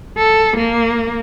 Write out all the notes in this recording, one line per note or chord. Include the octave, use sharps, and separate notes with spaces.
A4
A#3